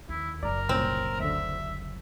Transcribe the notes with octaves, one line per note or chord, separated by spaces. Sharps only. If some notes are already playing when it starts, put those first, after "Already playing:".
D#2 E4
F#1 F#3 A#4 D5 A#5
C2 A#2 C4 C#4
D2 D3 E5